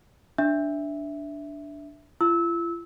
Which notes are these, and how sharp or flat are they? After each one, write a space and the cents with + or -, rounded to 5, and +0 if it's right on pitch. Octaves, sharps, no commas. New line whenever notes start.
D4 -5 E5 +0
F4 -45 E6 -25